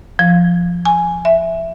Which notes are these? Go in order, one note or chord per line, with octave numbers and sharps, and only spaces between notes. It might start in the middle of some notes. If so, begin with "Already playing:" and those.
F3
G#5
E5